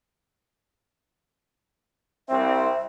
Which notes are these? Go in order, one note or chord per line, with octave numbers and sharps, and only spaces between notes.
C2 C4 E5